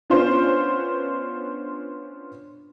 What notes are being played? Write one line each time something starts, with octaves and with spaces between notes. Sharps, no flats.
B3 C#4 D4 F4 C5